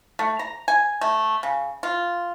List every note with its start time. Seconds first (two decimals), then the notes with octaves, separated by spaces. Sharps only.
0.19 A3
0.39 A#5
0.68 G#5
1.01 A3
1.43 C#3
1.83 F4